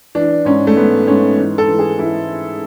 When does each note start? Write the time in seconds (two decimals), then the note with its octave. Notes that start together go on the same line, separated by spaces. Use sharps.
0.15 E3 D4
0.45 G#2 C#4
0.67 A3
0.76 G#2 B3
1.08 G#2 C#4
1.37 E3
1.58 A4
1.68 E3
1.79 G#4
1.99 E3 E4